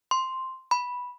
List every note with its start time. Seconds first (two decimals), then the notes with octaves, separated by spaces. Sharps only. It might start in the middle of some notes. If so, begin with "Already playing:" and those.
0.11 C6
0.71 B5